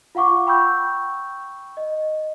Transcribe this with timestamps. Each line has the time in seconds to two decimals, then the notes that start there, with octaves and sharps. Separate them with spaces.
0.15 F4 F5 F#5 C#6 D6
0.47 G5 B5 C#6 E6 G6
1.77 D#5